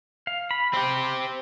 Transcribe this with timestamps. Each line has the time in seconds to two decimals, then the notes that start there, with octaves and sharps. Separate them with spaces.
0.27 F5
0.51 B5
0.73 C4 G4